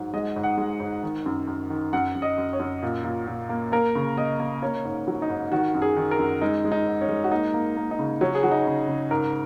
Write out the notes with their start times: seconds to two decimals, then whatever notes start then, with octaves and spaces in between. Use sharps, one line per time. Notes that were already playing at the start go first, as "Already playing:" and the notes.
Already playing: G#2 F#3
0.13 G#3 D#5
0.36 G#2
0.43 F#5
0.58 G#3
0.80 G#2
1.03 D#3
1.26 F#2
1.47 F#2
1.70 D#3
1.93 F#2 F#5
2.15 F#2
2.22 D#5
2.38 F#2
2.53 C#5
2.59 F#2
2.83 A#2
3.04 A#2
3.27 A#2
3.49 A#3
3.72 A#3 A#4
3.95 C#3
4.17 A#3 D#5
4.40 A#3
4.62 A#3 C#4
4.85 G#2
5.07 F#3
5.22 D#4
5.29 G#2
5.51 D#3 F#4
5.74 F#2
5.82 G#4
5.97 D#3
6.11 A#4
6.19 F#2
6.42 G#3 D#4
6.64 G#3
6.72 D#4
6.86 G#2
7.01 C#4
7.09 G#3
7.24 F#4
7.31 A#3 D#4
7.54 A#3
7.77 A#3
7.91 D#4
7.99 C#3
8.21 F#3 C#4
8.35 G#4
8.43 F#3 F#4
8.52 D#4
8.66 C#3
8.88 C#3
9.11 G#2 A#4